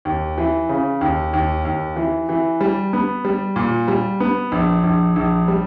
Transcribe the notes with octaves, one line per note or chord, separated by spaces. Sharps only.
D#2
E3
C#3
D#2
D#2
D#2
E3
E3
G3
B3
G3
A#2
G3
B3
A#1
A#1
A#1
G3